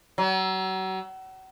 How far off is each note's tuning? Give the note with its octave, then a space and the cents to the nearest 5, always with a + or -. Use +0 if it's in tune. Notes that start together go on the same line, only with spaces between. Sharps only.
F#3 +35